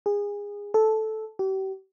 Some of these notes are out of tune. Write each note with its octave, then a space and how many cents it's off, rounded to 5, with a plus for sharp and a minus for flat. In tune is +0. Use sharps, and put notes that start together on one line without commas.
G#4 -25
A4 -10
G4 -40